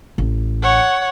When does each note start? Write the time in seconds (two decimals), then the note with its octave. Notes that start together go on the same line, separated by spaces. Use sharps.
0.18 A1
0.62 C#5 F#5